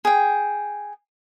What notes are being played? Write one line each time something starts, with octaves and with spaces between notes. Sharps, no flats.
G#4 G5